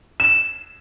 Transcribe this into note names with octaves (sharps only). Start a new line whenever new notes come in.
E7